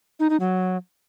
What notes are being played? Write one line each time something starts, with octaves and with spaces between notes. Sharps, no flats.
D#4
D#4
F#3